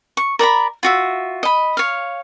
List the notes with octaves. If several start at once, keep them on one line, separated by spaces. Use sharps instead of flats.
C#6
A#4 D5 A#5 B5
F4 F#4 E5
D#5 B5
C#5 F5